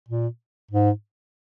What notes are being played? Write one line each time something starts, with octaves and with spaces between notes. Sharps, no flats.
A#2
G#2